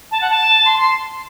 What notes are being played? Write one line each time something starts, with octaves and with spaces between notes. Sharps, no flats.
A5
F#5
A5
C6
C6